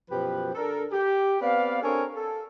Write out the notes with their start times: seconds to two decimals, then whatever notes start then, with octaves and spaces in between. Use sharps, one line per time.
0.10 F#2 B2 F3 G4 B4
0.55 D4 A4 A#4
0.92 G4
1.41 B3 C4 B4 D5 F5
1.82 C4 D4 A4 A#4 C#5 G#5
2.15 A4